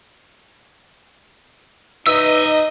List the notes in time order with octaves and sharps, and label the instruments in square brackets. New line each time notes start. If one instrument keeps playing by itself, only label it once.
[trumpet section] D#4 [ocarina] B4 [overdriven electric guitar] D#5 E5 [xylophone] E6